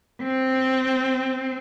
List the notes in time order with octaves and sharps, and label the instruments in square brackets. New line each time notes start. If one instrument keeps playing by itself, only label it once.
[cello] C4